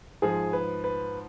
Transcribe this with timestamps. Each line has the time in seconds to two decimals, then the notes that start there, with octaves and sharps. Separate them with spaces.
0.22 G#2 F3 G#4
0.53 B4
0.84 B4